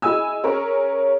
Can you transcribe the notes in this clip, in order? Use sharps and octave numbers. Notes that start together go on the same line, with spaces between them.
E4 G#4 D#5 G#5 E6
C#4 G#4 A#4 C#5